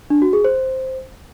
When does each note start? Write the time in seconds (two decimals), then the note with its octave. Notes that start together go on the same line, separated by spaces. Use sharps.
0.10 D4
0.22 F#4
0.33 G#4
0.45 C5